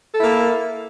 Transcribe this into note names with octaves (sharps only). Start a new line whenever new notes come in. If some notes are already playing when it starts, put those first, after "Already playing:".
A#3 E4 A4